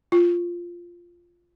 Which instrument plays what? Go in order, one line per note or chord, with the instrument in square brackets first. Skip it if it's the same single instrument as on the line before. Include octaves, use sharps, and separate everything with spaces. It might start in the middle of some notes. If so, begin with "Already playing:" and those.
[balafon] F4